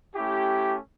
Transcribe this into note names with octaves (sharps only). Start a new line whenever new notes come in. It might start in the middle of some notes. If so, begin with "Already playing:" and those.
A3 C#4 E4 G4